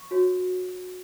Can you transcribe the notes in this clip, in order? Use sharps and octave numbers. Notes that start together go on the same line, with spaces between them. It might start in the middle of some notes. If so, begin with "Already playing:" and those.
Already playing: C#6
F#4 C#5